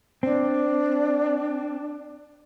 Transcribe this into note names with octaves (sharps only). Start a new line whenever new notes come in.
C4 D4